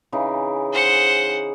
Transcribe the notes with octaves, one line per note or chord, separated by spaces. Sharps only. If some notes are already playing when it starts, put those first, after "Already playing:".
C#3 E3 D#4
C5 F#5